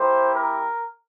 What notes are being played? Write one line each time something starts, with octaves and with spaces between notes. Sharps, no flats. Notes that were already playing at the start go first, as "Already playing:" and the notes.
Already playing: A#3 E4 G4 C5
A#4